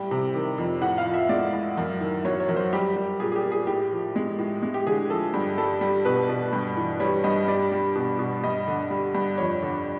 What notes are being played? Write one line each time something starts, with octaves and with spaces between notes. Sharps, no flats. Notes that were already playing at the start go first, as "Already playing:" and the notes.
Already playing: A2 G3 G5
C3
D#3
F2
A2 F#5
F5
F3
E5
G#3 D5
A2
F#2
D#3
F#3 C#5
C#5
F#2
C5
G3 G4
G3
A#2 G#4
G#4
G4
A#2
G#4
A2 G4
F3
G#3
A2
G#3
G4
D3 G#4
F3 A4
G2
G3 A4
G3
B2 B4
B2
G2
E3
G3 C#5
G2 D#5
G3 D5
G3
B2
B2
G2 D#5
D3
G3
G2
F2 C#5
D3